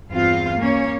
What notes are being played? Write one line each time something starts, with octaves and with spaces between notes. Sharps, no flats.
E2 G2 C4 F4 F5
A#3 C#4 C#5